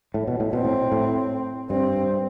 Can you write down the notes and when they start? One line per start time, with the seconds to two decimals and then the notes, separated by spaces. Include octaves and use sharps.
0.14 A2
0.27 B2
0.40 A2
0.53 B2 C4
0.65 A2
0.92 A2
1.70 G2 C4